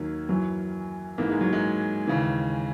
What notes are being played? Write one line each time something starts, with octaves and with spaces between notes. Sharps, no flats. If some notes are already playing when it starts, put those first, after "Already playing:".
Already playing: D#2 D#3 F#3 A#3
F#2 E3 F#3
G#2 E3 A#3
G#3
F#3
G#3
D#2 C#3 E3